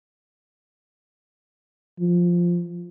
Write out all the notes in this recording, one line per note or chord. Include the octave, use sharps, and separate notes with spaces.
F3